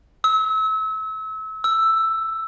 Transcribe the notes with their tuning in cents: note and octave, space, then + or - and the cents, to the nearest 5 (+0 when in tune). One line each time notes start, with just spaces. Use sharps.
E6 -30
E6 +5